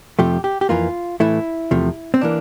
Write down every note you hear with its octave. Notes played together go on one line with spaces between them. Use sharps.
F2 C3 F3 A3 G4
G4
G4
F2 E3 A#3 F4
A2 E3 A3 E4
E2 C3 F3 A3
C4
E3 A#3 D4